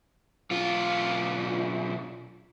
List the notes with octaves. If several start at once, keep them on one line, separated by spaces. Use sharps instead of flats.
B1 F4